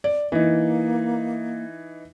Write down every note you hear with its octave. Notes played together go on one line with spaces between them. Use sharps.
D5
E3 A#3 D#4